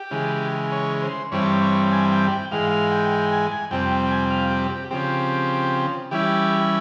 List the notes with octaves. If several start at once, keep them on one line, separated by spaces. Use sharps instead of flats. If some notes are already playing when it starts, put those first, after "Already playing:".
Already playing: G4
C#3 E3 G#3
C#5
C5
G2 E3 G3 C4 C#5
C#5
G#5
G5
G5
G#2 E3 G#3 F5
F5
G5
G5
G#5
G#5
F2 C3 G3 C4 G5
G5
G5
G#5
F5
G4
G4
C#3 F3 C4 G4
E3 G3 C#4 E4 G4